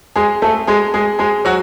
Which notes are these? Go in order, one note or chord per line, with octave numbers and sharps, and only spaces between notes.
G#3 G#4
A3 A4
G#3 G#4
G#3 G#4
G#3 G#4
F#3 F#4